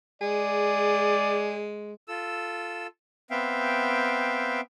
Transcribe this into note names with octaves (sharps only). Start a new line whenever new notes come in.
G#3 G#4 D5
F4 A4 E6
B3 C4 E5 F5 G5